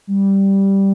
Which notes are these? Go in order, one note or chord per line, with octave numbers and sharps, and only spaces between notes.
G3